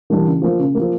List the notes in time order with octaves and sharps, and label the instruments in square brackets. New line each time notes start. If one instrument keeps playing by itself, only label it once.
[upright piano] E3 G3 A#3 D4
C#3
F3 A#3
C#3
F3 A#3